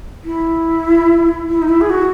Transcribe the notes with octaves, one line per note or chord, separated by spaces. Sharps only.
E4
E4
D#4
E4
G#4
F#4